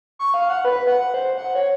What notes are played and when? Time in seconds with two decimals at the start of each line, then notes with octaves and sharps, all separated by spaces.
0.19 C#6
0.34 F5
0.50 F#5
0.65 B4
0.87 F#5
1.14 C5
1.38 F#5
1.55 C#5